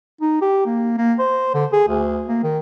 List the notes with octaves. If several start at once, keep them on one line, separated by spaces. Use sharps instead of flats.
D#4
G4
A#3
A#3
C5
D3
G#4
D2
A#3
D#3